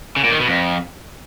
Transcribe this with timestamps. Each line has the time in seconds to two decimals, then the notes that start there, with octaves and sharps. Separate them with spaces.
0.16 C#3
0.24 A#2
0.32 D#3
0.40 B2
0.48 F2